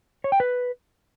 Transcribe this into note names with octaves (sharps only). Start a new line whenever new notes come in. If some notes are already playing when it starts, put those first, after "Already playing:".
C#5
G5
B4